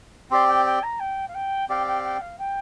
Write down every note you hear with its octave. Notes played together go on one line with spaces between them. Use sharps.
C4 G4 D5 C6
G5
G5
A#5
G5
F5
G5
C4 G4 D5 F5 G5
G5
G5
F5
G5